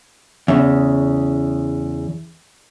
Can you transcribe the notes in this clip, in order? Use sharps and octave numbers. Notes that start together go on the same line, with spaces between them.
E2 C#3